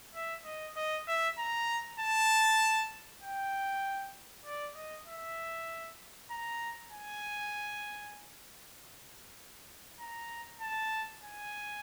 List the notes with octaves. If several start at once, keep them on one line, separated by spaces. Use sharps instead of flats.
E5
D#5
D#5
E5
A#5
A5
G5
D5
D#5
E5
A#5
G#5
A#5
A5
G#5